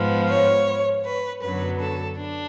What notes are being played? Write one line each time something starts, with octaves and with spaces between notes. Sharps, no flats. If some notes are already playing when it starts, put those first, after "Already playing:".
Already playing: G#2 F3 B3
C#5
B4
F#2 D3 F#3 B3 B4
A4
D4